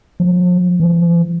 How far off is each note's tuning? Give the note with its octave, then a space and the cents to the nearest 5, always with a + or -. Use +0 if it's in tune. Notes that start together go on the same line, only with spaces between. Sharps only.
F3 +35
F3 -45